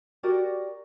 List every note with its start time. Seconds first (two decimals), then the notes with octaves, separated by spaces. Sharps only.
0.23 F#4 G4 A#4 D5